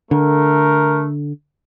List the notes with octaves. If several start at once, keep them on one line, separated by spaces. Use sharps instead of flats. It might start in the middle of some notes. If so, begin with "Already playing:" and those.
D3 A3 A#4